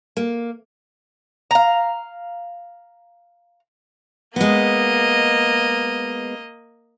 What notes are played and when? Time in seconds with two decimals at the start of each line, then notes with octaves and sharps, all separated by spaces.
0.17 A#3
1.51 F5 A#5
4.36 G#3 A#3 B3 D#5